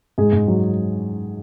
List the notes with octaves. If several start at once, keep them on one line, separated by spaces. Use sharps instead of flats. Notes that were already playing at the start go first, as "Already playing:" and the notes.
G#2 G#4
G#2
F#3